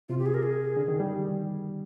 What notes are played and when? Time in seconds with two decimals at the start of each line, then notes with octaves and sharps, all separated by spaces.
0.09 C3 F4
0.19 G4
0.26 G#4
0.34 A#4
0.43 G#4
0.77 D3
0.88 D#3
1.00 G3